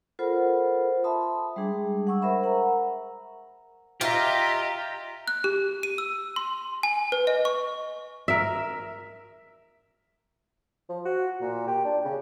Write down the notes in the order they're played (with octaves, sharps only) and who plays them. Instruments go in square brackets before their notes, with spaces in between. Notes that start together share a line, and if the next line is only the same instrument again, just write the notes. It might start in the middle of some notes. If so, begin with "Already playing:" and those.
[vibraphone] F4 A4 A#4 C5 F#5 B5
E5 A5 B5 C6 D#6
G3 G#3 D4 G#4
F#5 C#6 E6
A#4 C5 E5 B5
A#4 F#5 A#5
[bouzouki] F4 [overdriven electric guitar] G4 [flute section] D#5 E5 A#5
[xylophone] F#6
G4
D#7
E6
C6
G#5
B4
D#5
C#6
[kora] A#4 E5
[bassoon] F3
F#4
A#2
G4
D4
C#3